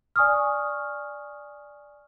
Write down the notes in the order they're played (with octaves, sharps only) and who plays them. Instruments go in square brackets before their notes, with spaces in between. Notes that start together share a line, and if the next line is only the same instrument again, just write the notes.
[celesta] D5 G#5 C#6 D#6 F6